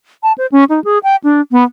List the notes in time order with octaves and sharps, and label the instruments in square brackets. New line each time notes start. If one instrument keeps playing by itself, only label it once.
[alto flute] A5
C5
C#4
D#4
G#4
G5
D4
B3